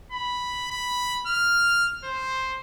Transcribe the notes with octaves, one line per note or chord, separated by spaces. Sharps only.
B5
B5
F6
C5